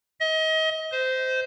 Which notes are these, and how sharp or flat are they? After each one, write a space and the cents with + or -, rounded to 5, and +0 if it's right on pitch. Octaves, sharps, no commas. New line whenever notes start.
D#5 +30
C5 -15